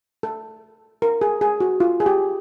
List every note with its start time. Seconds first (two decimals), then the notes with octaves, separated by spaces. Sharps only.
0.23 A4
1.02 A#4
1.21 G#4
1.41 G#4
1.60 F#4
1.80 F4
2.00 G#4
2.06 G4